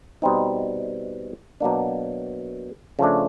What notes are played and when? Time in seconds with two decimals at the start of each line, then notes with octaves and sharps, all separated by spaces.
0.22 B2 G3 C4 D#4
1.60 B2 F#3 A#3 D4
2.99 C#3 F3 A3 D4